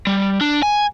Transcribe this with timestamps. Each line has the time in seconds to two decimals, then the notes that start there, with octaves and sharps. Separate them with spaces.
0.07 G3
0.41 D4
0.63 G#5